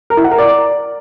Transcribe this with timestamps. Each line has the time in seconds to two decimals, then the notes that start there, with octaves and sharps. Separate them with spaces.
0.10 A#4
0.17 E4
0.24 F#5
0.31 A#4
0.38 D5